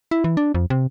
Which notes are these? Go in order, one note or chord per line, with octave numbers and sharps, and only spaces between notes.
E4
E3
D4
F2
C3